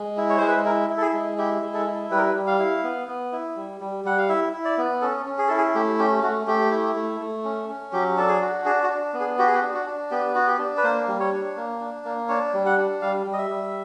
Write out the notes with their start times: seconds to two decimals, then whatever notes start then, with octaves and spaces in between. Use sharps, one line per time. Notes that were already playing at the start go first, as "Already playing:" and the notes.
Already playing: G#3
0.17 E4
0.30 C#5
0.38 G#3 C5
0.47 B4
0.56 C5
0.65 E4 A#4
0.90 E4
0.97 A4
1.02 G#4
1.14 G#3
1.38 E4 G4
1.62 G#3
1.74 A4
1.87 E4
2.11 G3 B4
2.18 A#4
2.26 B4
2.35 G3
2.47 F5
2.59 E4
2.83 B3
3.08 B3
3.32 E4
3.56 G3
3.81 G3
4.05 G3 F#5
4.18 F5
4.29 E4 E5
4.53 E4
4.65 D5
4.78 B3
5.02 C#4 A4
5.26 C#4
5.38 G#4
5.48 E4 A4
5.58 G#4
5.75 A3 G4
5.99 C#4 G4
6.23 A3 F#4
6.47 A3 G4
6.71 E4
6.96 A3
7.21 A3
7.44 C#4
7.69 C#4
7.93 F#3 G4
8.17 D4 A4
8.28 G#4
8.41 F#4
8.65 D4 G#4
8.84 F#4
8.90 D4
9.14 B3
9.20 G#4
9.38 F#4 G4
9.47 G#4
9.55 G4
9.63 D4
9.74 F#4
9.86 D4
10.11 B3 G4
10.35 F#4
10.47 G4
10.59 D4
10.77 B4
10.83 A#3 C5
11.08 G3
11.20 C#5
11.32 D4
11.57 A#3
11.80 D4
12.05 A#3
12.29 D4 C#5
12.54 G3
12.66 F#5
12.77 D4
13.02 G3 F5
13.26 G3
13.33 D#5
13.38 E5
13.50 G3